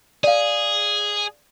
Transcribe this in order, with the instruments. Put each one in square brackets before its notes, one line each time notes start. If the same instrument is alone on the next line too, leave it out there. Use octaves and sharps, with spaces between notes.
[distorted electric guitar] G#4 [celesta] D5 F5